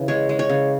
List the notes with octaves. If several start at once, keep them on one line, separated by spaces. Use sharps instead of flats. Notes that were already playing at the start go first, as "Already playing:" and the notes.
Already playing: C#3 E3
G#3 C#5
G#3
C#5
C#3